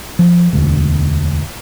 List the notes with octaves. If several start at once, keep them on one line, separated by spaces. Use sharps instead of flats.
F3
E1 D2